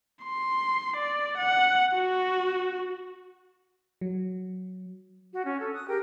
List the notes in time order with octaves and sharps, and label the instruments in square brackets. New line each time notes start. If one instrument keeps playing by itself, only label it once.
[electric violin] C6
D5
F#5
F#4
[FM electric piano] F#3
[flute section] F#4
C#4
A4
D#6 F#6
G4 G#4 A#4 G5